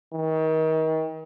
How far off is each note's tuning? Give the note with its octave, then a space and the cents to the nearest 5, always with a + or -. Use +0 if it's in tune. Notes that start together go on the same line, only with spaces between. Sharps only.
D#3 +35